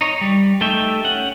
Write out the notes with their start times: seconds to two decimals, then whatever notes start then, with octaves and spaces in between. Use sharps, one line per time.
0.01 D#4 C#5
0.21 G3
0.61 A3 D#4 G4 E5 G5
1.05 C#4 F#5